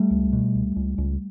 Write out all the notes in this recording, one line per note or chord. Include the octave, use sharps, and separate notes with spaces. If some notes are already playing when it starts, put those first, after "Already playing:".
Already playing: G3 A3
C#2
B2
C#2
C#2
C#2